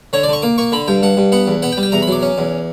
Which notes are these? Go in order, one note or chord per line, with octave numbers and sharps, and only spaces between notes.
D3 C#5
D5
D3 C#6
A#3 D6
A#3 C#6
D3 B5
G2 G5
G2 F#5
G2
B3 F#5
E2
B3 F#5
G5
G3
G5
E2 A#5
B5
F#3 D6
C#4
E2